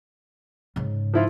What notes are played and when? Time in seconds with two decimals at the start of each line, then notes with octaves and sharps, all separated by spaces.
0.76 G#2 C#3
1.14 F3 E4 F4